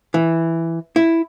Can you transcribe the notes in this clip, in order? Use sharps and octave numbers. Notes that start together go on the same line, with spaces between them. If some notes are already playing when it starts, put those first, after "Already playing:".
E3
E4